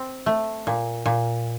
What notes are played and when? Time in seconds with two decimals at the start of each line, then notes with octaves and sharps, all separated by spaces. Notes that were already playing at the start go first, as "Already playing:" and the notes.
Already playing: C4
0.26 A3
0.67 A#2
1.06 A#2